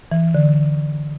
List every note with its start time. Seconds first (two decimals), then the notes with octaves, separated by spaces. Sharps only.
0.12 E3
0.35 D3